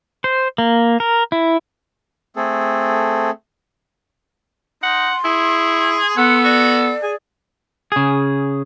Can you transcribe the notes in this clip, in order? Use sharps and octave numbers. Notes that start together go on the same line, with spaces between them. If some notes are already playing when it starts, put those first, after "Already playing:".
C5
A#3
A#4
E4
A3 C4 G#4 A4
D#4 F#5 C6
E4 G#4
B3 A4 F#5
F#4 D5
G#4 G#5
C#3 G#4